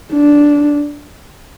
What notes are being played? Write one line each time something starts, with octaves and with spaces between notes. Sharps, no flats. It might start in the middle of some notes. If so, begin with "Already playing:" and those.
D4